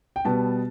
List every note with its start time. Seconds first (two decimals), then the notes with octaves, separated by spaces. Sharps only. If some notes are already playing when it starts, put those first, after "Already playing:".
0.16 G5
0.25 B2 G3 B3 A5